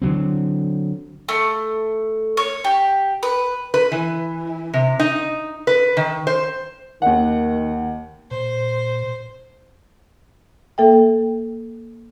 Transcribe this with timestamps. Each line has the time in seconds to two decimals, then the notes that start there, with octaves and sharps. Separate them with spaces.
0.02 D3 F#3 C4
1.29 A3
2.37 C#5
2.64 G4
3.23 B4
3.74 B4
3.92 E3
4.74 C3
5.00 D#4
5.67 B4
5.97 D#3
6.27 C5
7.02 D#2 D#3 F#5
8.31 A#2 C5
10.78 A#3 A4 E5 G5